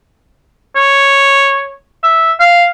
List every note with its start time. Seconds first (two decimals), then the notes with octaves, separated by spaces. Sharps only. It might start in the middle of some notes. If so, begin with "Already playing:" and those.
0.76 C#5
2.03 E5
2.40 F5